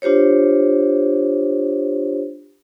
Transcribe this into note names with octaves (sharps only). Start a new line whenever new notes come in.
D4 F4 G4 C5 C#5